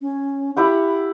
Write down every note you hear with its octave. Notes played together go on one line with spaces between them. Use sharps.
C#4
E4 G4 F#5 B5